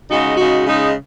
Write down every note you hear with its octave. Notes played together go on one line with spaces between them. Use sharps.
C#3 G#3 D#4 F#4
C#3 G#3 D#4 F#4
C#3 G#3 D#4